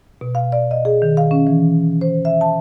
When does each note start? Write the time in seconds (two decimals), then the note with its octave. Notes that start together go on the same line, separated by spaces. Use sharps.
0.21 B2
0.35 F5
0.52 D5
0.71 D#5
0.85 G#4
1.02 D#3
1.17 F5
1.31 C#4
1.47 E3
2.01 C5
2.25 E5
2.41 A5